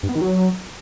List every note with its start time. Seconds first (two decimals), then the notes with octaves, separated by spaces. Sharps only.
0.03 G2
0.09 B3
0.15 D#3
0.21 F#3